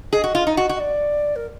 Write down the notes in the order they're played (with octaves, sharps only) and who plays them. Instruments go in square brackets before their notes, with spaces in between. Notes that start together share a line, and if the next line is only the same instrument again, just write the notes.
[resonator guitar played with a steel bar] G#4 [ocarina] D#5
[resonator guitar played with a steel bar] F#4
F4
D#4
F#4
F#4
[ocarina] D#5
D5
A#4